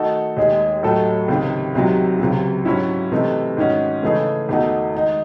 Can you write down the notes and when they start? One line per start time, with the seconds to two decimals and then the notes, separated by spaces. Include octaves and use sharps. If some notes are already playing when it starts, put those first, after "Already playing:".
Already playing: D#3 A3 D#4 F#4 A4
0.37 D#2 D#3 G#3 D#4 G#4
0.83 A2 F#3 A3 D#4 A4
1.28 C#2 C3 D#3
1.75 C2 C3 D#3 F#3
2.20 C#2 C3 F#3
2.65 G#2 F#3 C#4 E4
3.12 C3 E3 A3 D#4
3.57 G#2 D#3 G#3 C#4 F#4
4.03 C#3 E3 A3 D#4 G#4
4.49 E2 D#3 A3 D#4 F#4
4.94 D#3 G#3 D#4